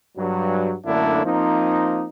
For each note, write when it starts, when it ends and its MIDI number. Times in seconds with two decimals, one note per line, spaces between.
0.17 0.75 43
0.17 0.75 54
0.86 1.24 42
0.86 1.24 50
0.86 1.24 57
0.86 1.24 58
0.86 1.24 62
0.86 1.24 64
1.25 2.06 53
1.25 2.06 58
1.25 2.06 60
1.25 2.06 63